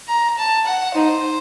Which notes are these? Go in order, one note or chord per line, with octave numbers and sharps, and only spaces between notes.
A#5
A5
F#5
D#4 C5